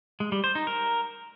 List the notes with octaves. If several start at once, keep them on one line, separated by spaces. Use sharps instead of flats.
G#3
G3
C5
D#4
A#4